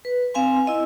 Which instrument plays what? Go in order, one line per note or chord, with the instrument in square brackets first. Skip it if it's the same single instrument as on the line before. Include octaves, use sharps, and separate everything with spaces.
[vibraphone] B4
C4 F5 G#5 C6
E4 D#5